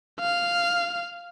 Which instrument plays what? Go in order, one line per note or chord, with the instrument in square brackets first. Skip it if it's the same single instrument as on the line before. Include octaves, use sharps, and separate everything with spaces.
[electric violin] F5